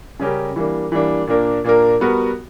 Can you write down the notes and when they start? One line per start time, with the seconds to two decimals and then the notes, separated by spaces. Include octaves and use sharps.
0.19 C#3 G3 C#4 G4 A#4
0.56 E3 G3 A#3 D4
0.92 E3 G3 A#3 D4
1.27 A#2 A#3 D4 A#4
1.64 A#2 A#3 D4 A#4
2.00 G3 B3 F#4 A#4